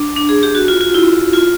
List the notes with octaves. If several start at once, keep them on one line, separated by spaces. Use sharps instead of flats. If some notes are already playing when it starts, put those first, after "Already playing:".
Already playing: D4
D4
G#4
G4
F#4
F4
F4
E4
F4